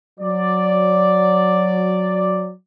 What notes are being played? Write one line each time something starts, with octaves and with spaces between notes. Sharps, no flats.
F#3 D5